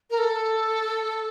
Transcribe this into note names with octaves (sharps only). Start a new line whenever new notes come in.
A#4
A4